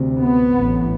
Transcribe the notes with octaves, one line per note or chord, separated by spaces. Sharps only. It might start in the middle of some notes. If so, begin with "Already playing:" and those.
Already playing: D2 C3
B3
A1 A2